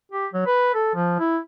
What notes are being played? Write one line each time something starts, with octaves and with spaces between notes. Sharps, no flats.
G4
F#3
B4
A4
F3
E4